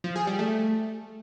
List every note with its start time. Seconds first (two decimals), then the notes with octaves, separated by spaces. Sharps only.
0.04 F3
0.16 G#4
0.27 G3
0.39 A3